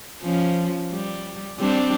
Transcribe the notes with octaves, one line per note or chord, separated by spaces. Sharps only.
F3 C#4
G3
G3 C4 D4